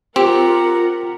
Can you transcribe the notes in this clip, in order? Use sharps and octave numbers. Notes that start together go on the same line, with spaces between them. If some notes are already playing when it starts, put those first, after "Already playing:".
C4 F4 G4 A#4 F#5 A#5